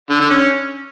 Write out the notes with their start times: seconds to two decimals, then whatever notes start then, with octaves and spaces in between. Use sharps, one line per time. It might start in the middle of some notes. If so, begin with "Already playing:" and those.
0.10 D3
0.20 D3
0.30 C#4